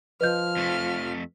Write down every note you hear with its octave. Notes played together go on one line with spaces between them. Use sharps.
F3 B4 D#5 F6 G6
F2 A3